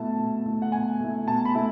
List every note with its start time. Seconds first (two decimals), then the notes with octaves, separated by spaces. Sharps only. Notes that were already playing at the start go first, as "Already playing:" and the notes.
Already playing: B2 A3 E4 A5
0.18 B2
0.46 A3 E4
0.62 F#5
0.72 B2 G#5
1.00 A3 E4
1.28 B2 A5
1.45 B5
1.55 A3 E4